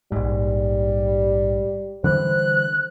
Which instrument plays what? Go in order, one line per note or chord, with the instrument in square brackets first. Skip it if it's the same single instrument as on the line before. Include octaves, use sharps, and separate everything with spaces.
[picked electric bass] A#1 G#2 [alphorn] G3
[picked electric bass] D3 E3 G3 [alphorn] C5 [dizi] F#6